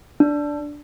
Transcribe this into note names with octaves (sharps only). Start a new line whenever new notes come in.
D4